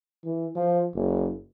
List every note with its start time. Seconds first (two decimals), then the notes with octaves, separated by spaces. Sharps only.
0.25 E3
0.56 F3
0.95 F#1